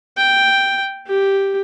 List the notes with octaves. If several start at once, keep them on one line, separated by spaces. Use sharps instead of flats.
G5
G4